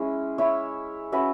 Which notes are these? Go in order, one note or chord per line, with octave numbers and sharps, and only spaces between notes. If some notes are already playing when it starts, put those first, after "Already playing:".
Already playing: G#3 C#4 E4
E4 C#5 E5
C#4 F#4 B4 E5